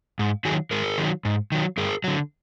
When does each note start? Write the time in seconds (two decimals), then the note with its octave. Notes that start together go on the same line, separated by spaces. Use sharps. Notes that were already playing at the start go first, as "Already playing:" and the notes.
0.19 G#2
0.45 D#3 F#3 F#4 G#4
0.71 G#2 G#4 A#4
0.98 D#3 F#3
1.25 G#2
1.52 D#3 F#3
1.77 G2 G#4 A#4
2.04 D3 F#3